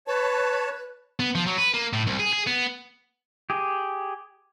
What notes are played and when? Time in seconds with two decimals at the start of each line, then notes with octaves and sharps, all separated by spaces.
0.07 B4 C#5 A5
1.20 B3
1.35 F3
1.47 F#3
1.58 B4
1.74 A#3
1.93 A2
2.07 C2
2.19 G#4
2.33 G#4
2.47 B3
3.50 G4 G#4